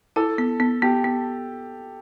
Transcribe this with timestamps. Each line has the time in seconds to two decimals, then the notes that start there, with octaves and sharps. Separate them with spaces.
0.16 E4 A4
0.38 B3
0.60 B3
0.82 B3 G4
1.04 B3